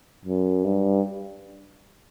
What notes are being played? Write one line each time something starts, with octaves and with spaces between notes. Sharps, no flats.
F#2
G2